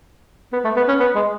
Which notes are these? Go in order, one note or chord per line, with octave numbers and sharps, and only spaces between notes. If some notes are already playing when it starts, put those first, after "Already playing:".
B3
A3
B3
C#4
B3
G#3